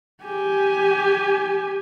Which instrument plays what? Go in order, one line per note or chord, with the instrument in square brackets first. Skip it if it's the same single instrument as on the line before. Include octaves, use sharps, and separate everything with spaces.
[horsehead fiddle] G4 G#5